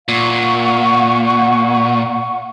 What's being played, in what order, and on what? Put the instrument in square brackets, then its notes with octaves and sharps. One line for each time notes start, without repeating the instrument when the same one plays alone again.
[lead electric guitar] A#2 [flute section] F5 F#5 C#6